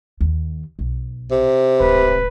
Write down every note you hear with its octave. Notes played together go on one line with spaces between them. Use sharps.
D#2
B1
C3
D1 G#1 B4